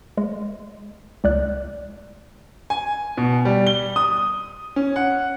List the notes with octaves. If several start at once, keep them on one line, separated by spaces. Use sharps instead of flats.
G#3
C#2 D5 F#6
G#5
B2
G3
G7
D#6
C#4
F#5